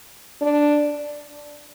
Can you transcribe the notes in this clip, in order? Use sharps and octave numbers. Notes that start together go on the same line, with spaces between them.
D4